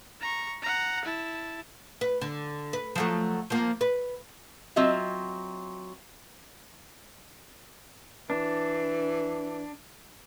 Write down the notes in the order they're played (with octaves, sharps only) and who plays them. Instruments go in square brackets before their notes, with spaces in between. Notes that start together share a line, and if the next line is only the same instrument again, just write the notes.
[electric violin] A#5 C#6
F#5 A#5
E4 A5
[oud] B4
D3
B4
F3 F#3 A3
F3 A#3
B4
[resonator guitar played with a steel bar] F#3 C4 F4 D#5 E5
[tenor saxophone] E3 [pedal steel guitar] D4